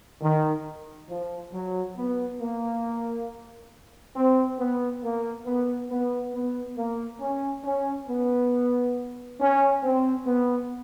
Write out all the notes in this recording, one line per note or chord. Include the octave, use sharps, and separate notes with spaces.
D#3
F3
F#3
B3
A#3
C4
B3
A#3
B3
B3
B3
A#3
C#4
C#4
B3
C#4
C4
B3